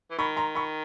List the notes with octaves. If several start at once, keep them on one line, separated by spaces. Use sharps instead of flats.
E3
D#3 B5 C#6
A#5 C6
B5 C#6